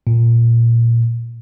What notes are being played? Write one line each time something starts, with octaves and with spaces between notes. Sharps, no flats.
A#2